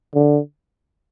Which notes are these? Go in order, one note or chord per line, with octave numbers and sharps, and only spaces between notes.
D3